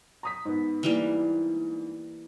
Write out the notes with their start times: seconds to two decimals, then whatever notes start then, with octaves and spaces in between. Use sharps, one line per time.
0.23 A#5 D#6 B6
0.45 G#2 B3
0.83 E3 G3 A#3